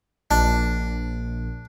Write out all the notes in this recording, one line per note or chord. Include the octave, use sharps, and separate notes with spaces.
A#1 D4